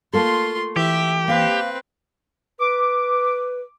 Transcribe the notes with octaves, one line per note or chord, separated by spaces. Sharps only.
A3 A#3 F4 A4 C6
E3 G4 E5
A#3 C4 B4 F5
B4 D6